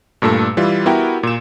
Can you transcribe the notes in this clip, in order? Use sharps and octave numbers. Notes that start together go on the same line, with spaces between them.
G2 A#2 A3 A4 E6
E3 G3 F4
B3 E4 F#4 G4 A#4 G5
A#2 E7